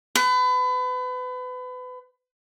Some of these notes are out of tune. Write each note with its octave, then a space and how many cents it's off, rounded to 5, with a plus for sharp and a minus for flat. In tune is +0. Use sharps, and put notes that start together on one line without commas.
B4 +30